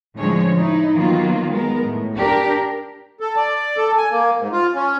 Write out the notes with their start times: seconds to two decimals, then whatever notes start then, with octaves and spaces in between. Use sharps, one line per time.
0.16 A2 D3 F3 G#3 C#4 C#5
0.59 D#4 E4
0.96 D#3 F#3 A#3 B3 F4
1.51 G#3 B3 A#4
1.85 A2
2.15 D4 G4 A#4
3.20 A4
3.36 D5
3.77 A4
3.98 G#5
4.11 A#3
4.38 G#2
4.52 F4
4.75 C#4